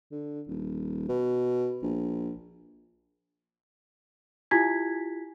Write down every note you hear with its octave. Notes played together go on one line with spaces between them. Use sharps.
D3
D#1
B2
A#1
E4 F4 G4 G#5 G#6 B6